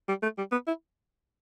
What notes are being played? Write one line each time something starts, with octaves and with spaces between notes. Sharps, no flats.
G3
A3
G3
B3
E4